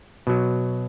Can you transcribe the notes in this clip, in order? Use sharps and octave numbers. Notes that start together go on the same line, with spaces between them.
B2 F#3